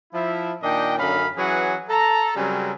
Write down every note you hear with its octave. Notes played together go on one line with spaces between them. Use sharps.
F3 E4 E5
A#2 D#3 D4 D#5 G5
F#2 D3 C#4 D#4 F5 B5
E3 F#3 C#4 G#4 B4 F#5
A4 A#5
C#3 F#3 G3 C4 C#4 A#4